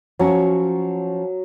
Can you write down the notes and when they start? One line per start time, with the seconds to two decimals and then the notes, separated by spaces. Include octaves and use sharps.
0.19 F3 F#3 C#4